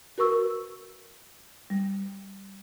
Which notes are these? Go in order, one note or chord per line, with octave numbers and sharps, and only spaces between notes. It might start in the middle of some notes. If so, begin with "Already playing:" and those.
F#4 A#4 B4 C#6 E6
G3